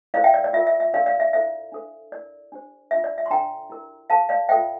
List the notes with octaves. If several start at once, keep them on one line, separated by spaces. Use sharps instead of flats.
E4 A4 C5 D5 F5
E5 G5
D5
D5
F4 A#4 E5
E5
E5
D4 G4 A#4 D5 F5
D5 F5
E5
E4 A4 C5 E5
D4 A4 C5
E4 A#4 D5
D4 G4 C5
D4 F4 C5 E5
D5
E5
C6
D4 A4 C5 G5 A#5
E4 G4 A#4
E4 A4 C5 F5 A5
D5 F5
F4 A4 C5 E5 G5